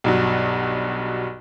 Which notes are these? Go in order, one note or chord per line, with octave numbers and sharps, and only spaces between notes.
B1 G2 F#3